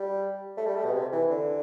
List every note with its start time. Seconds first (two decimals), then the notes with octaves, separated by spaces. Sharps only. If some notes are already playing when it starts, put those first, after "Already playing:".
Already playing: G3
0.57 A3
0.66 G3
0.76 A3
0.85 B2
0.94 C3
1.12 E3
1.30 D3